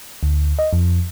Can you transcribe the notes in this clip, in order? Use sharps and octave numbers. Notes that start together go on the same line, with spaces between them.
D2
D#5
F2